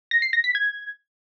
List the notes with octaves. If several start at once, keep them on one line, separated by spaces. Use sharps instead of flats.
A#6
C7
A#6
B6
G#6